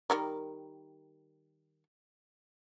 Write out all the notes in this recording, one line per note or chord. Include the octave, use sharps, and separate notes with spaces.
D#3 G3 A#4